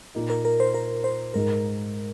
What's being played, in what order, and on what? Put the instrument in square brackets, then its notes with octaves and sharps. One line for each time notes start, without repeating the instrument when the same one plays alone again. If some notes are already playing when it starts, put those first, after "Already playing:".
[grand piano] A#2 A#3 D#4
[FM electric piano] A#4
A#4
C5
A#4
C5
[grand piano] G#2 G#3 D#4 [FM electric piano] A#4